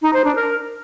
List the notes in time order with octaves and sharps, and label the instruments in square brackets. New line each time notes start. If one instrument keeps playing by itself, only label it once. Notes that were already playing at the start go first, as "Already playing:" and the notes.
[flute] D#4
C5
D4
A#4